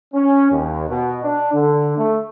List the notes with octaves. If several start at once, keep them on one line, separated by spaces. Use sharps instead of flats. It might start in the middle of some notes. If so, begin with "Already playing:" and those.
C#4
D#2
B2
D4
D3
A3